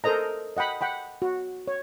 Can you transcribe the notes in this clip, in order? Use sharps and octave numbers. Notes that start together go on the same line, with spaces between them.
A4 A#4 C5 D#5 A#5
D#5 F#5 G5 B5
F#5 G5 B5
F#4
C#5